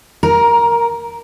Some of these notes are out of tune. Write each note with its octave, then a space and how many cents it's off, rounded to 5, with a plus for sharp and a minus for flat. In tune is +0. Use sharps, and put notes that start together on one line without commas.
A#4 +0 A#5 +20